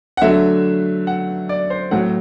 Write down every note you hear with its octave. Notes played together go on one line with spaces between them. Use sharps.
F#5
D3 F#3 A3 E5
F#5
D5
C5
A2 F#3 A3 F#5